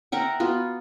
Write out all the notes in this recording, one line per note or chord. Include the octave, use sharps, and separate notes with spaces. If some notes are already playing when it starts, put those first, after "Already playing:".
A#4 E5 F#5 G5
B3 F4 F#4